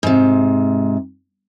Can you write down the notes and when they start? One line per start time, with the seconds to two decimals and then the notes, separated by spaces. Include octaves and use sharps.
0.03 G#2 C3